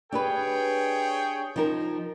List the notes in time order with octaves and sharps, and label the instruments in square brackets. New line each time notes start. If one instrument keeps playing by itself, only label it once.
[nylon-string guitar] D4 G4 B4 [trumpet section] G#4 C#5 G5
[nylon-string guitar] F3 D#4 A#4